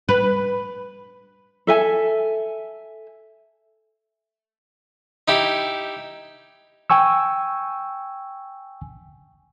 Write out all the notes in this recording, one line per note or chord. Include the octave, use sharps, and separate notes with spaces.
B4
A4 E5 G#5
D#4 E4 G4
G5 G#5 C#6 E6